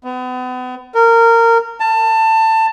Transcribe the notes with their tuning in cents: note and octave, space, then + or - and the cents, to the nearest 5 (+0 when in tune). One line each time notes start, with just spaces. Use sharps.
B3 +35
A#4 -20
A5 +20